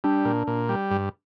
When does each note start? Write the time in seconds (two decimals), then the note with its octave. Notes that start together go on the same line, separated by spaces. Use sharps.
0.04 G3 D4
0.25 A#2
0.47 A#2
0.69 G3
0.91 G2